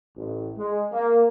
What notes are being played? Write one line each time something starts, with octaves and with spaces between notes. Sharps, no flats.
A1
G#3
A#3